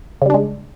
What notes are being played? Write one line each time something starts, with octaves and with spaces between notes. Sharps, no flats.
C#3 G3 G#3 D4